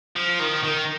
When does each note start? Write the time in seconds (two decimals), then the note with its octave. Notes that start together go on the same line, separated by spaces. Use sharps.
0.16 F3
0.40 D#3
0.63 D#3